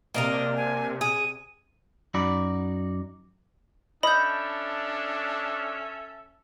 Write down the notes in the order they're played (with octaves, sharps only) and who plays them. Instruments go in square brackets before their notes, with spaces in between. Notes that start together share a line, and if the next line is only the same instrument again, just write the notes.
[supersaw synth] C3 [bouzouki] A#3 D4 A#4 [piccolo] D#5
[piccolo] G#5
[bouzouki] G#4 [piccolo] D#7
[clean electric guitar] F#2 D#4 F#4 D5 B5
[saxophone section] C#4 A4 E5 [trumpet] D4 [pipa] D#5 [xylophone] B5 G6